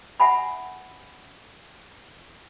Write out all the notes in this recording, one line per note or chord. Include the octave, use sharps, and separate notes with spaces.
E5 F#5 G#5 B5